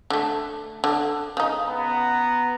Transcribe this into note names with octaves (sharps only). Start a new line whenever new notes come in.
D3 A3
D3
C#3 D#4
B3 A#5